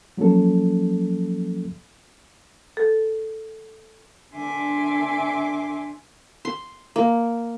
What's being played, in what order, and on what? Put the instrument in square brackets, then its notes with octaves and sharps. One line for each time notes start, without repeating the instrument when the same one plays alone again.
[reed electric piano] F3 F#3 A#3 C#4 A4
[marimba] A4
[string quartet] D3 D4 E5 G#5 C6 D6
[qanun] C6
A#3